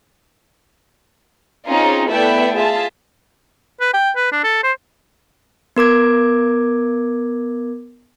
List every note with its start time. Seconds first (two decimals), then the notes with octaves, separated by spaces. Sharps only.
1.67 C4 C#4 D#4 F4 G#4
2.09 A3 B3 E4 D5 E5 G5
2.54 F4 G#4 E5 A5
3.81 B4
3.94 G5
4.16 B4
4.32 D4
4.44 A4
4.63 C5
5.76 B3 A#4 D6 G#6